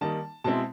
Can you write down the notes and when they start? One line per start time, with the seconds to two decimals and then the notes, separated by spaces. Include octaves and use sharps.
0.01 D#3 G3 A#3 D#4 A5
0.44 B2 G#3 C4 E4 A5